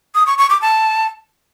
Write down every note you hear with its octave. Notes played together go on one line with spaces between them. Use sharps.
D#6
C#6
C#6
D6
A5